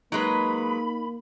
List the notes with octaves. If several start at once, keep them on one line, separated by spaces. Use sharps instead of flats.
F#3 G#3 A#3 D#4 B4 B5